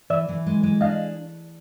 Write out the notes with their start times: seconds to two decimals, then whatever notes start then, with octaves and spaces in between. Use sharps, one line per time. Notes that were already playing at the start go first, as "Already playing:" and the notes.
0.10 E3 D5 E5
0.29 E3
0.46 G#3
0.63 G#3
0.81 D4 D#5 F5